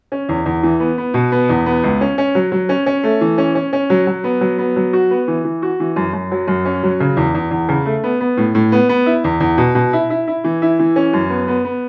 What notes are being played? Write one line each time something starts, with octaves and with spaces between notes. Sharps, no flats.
C#4
E2
E2
E3
B3
B3
B2
B3
E2
B3
C#2
C#4
C#4
F#3
F#3
C#4
C#4
A3
E3
C#4
C#4
C#4
F#3
F#3
B3
F#3
B3
F#3
F#4
B3
E3
E3
F#4
E3
F#2
F#2
F#3
F#2
C#4
F#3
C#3
E2
E2
E2
C#3
A3
B3
B3
A2
A2
B3
B3
E4
E2
E2
B2
B2
E4
E4
E4
E3
E4
E3
C#4
F#2
B3
B3
B3